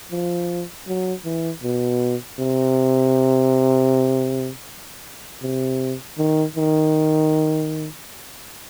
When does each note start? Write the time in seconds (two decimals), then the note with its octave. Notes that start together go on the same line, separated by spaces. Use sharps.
0.12 F3
0.87 F#3
1.25 E3
1.63 B2
2.39 C3
5.42 C3
6.18 D#3
6.56 D#3